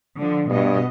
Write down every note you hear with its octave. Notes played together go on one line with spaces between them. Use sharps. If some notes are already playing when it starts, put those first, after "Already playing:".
D3 F3
G2 B2 B3 D#5